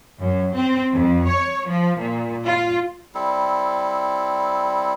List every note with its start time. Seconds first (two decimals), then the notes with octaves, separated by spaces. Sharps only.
0.22 F#2
0.55 C4
0.93 F2
1.27 C#5
1.68 F3
1.99 A#2
2.45 F4
3.15 G3 C4 E4 A4